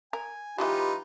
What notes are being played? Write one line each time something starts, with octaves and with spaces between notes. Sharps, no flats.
A#4 G#5
E3 F#3 G#3 D#4 F4 G4 B4